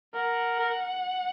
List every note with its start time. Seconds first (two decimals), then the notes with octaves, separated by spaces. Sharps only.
0.14 A#4 F#5
0.59 A#4